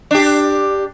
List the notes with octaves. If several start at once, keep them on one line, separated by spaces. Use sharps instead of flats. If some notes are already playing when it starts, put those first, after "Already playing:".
D4 G4